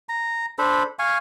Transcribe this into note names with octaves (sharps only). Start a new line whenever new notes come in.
A#5
D4 A4 C5 B5
F5 G#5 C#6